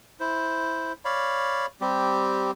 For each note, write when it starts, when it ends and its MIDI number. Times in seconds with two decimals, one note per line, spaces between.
0.20 0.93 64
0.20 0.93 72
1.05 1.66 73
1.05 1.66 74
1.05 1.66 77
1.05 1.66 83
1.81 2.51 55
1.81 2.51 60
1.81 2.51 67